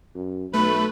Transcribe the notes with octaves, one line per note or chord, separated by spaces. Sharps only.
F#2
B1 A3 B4 B5